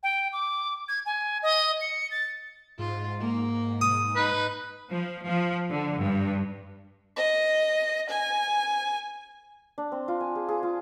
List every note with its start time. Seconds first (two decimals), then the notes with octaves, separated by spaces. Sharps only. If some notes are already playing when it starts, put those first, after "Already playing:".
0.03 G5
0.33 D6
0.88 G#6
1.06 G#5
1.43 D#5
1.81 C#7
2.11 A6
2.79 G#2 F4
3.20 A#3
3.81 D#6
4.16 D#4 B4
4.91 F3
5.25 F3
5.70 D3
6.02 G2
7.17 D#5
8.10 G#5
9.78 D4
9.92 C4
10.08 F4
10.20 G#5
10.35 G#4
10.49 G#4
10.63 F4